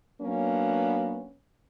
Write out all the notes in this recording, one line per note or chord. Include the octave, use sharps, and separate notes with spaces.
F#3 A#3 B3 C#4 D4